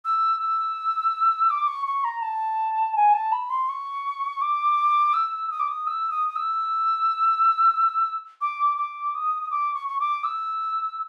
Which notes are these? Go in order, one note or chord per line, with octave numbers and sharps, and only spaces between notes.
E6
E6
D6
C#6
C#6
A#5
A5
G#5
A5
B5
C6
C#6
D6
E6
D#6
D6
D#6
E6
D#6
D#6
E6
D6
D6
D#6
D6
C#6
C#6
D6
E6